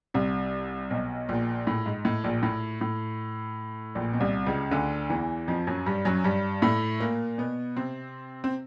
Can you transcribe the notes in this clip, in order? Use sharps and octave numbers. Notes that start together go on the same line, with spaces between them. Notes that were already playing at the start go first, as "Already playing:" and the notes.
C2 C3
B1 B2
A#1 A#2
A2
G#2
A2
A#1 A#2
A2
A2
A#1 A#2
B2
C2 C3
C#2 C#3
D2 D3
E2 E3
F2 F3
F#2 F#3
G2 G3
F#2 F#3
G2 G3
A2 A3
A#2 A#3
B2 B3
C3 C4
C4